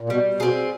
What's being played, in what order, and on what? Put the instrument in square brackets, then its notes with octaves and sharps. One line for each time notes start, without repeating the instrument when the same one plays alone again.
[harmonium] A#2
[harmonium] B2 [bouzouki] G3
[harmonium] B2 [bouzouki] C4 F4 G#4